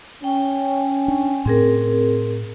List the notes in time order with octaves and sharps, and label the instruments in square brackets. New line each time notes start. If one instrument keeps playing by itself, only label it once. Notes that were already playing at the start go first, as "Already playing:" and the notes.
[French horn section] C#4 [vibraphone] G5
[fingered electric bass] D4
[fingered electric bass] A2 [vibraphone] C4 G#4 A#4